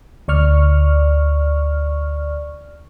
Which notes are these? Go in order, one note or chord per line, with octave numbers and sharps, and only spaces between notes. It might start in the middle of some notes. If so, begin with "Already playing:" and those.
D2 D5 C#6 F6